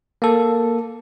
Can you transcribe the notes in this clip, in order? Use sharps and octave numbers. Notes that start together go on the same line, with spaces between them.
A#3 A4